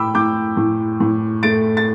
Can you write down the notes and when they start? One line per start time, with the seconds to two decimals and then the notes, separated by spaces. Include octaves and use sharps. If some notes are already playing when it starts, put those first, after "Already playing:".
Already playing: A2 G5 B5 D6 E6
0.15 A2 D6 G6
0.57 A2
1.00 A2
1.43 A3 A6 D7
1.77 A6